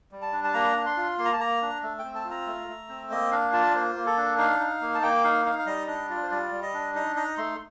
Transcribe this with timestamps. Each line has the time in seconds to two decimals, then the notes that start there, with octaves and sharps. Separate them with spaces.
0.12 G3
0.22 A5
0.32 D4
0.44 A5
0.54 A#3 A#5
0.76 D4
0.86 C6
0.97 F4
1.18 A#3 C6
1.25 A#5
1.33 A5
1.39 A#3 A#5
1.62 D4
1.83 A3
1.99 C4 G5
2.15 A5
2.25 F4
2.31 A#5
2.47 A3
2.68 A3
2.89 C4
3.10 A#3 D#5
3.31 D4 F5
3.53 F4 A5
3.71 D5
3.74 A#3 C5
3.95 A#3
4.06 A4
4.17 D4
4.38 D#4 F5
4.60 D#4
4.81 A#3
4.95 A5
5.02 A#3 G5
5.24 D#4 F5
5.45 D#4 F5
5.59 F5
5.66 G3 D#5
5.88 D4 D#5
6.10 F4 D5
6.23 C5
6.31 G3 D5
6.52 G3
6.62 D#5
6.74 D4
6.95 D#4 D#5
7.16 D#4 D#5
7.38 A3 C6